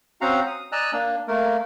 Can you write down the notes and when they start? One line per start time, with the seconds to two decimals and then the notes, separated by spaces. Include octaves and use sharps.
0.21 C4 C#4 F#4 F5 F#5 A#5
0.47 D#6
0.72 D5 D#5 G#5 A#5 E6 F#6
0.93 A#3 D4
1.28 A3 A#3 A#4